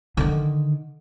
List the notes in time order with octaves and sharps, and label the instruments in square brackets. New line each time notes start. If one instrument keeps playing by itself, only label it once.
[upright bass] D3 D#3